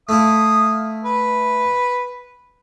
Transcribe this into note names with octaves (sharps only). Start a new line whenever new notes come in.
A3 E4 F5 D#6
B4